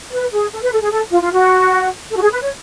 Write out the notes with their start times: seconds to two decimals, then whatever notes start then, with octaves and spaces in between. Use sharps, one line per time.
0.12 B4
0.32 G#4
0.52 A4
0.62 B4
0.72 A4
0.81 G#4
0.91 A4
1.11 F4
1.22 F4
1.32 F#4
2.11 A4
2.16 F#4
2.22 G#4
2.32 B4
2.41 C#5